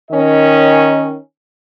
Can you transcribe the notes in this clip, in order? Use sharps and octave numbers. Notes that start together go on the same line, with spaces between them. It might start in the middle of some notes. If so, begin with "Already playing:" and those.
D#3 C#4 D#5